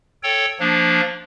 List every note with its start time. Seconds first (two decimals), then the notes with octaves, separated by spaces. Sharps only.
0.23 A4 C#5 G5
0.60 F3 A#3 D4